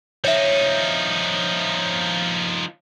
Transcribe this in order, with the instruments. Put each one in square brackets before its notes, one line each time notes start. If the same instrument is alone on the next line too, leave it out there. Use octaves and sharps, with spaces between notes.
[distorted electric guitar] F3 D#4 [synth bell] C#5 E5